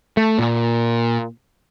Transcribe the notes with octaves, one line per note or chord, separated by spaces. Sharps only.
A3
A#2